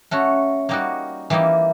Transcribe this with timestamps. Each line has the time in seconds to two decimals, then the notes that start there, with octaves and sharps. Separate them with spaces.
0.11 A3 C#4 F#4
0.69 G3 A#3 D#4 F#4
1.30 E3 G3 A#3 D#4